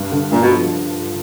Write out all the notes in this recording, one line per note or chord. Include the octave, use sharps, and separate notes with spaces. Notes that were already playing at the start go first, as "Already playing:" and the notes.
Already playing: G2
D3
G2 A#2
B2
F3